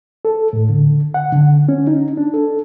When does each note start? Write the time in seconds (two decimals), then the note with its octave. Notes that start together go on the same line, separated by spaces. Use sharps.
0.25 A4
0.53 A2
0.70 D3
1.14 F#5
1.33 D3
1.69 C#4
1.87 D#4
2.17 D4
2.34 A4